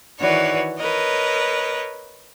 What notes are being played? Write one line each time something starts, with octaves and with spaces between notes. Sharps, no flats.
D#3 E3 F#4 B4 C#5 D5
A#4 B4 C#5 D#5